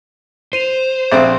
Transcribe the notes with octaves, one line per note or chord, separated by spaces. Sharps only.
C5 C7 D#7 F7
A#1 C4 E5